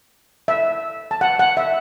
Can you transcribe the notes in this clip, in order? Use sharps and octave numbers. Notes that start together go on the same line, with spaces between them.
E5
A5
F#5
F#5
E5